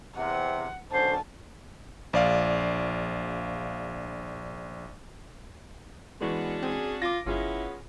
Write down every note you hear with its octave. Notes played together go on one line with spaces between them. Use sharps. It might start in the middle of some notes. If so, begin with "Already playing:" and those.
E2 C3 F#5
B1 D3 C#4 C5 A5
A#1 D5 F5
E3 G#3 B3 C#4 D4 F#4
C4 G#4
F4 D6 A#6
G1 B3 C#4 E4 F4 G#4